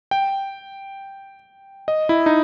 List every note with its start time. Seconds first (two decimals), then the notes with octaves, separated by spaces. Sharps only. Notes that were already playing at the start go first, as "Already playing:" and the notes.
0.11 G5
1.88 D#5
2.09 E4
2.26 D#4